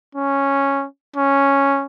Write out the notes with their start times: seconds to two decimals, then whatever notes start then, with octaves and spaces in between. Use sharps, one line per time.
0.15 C#4
1.16 C#4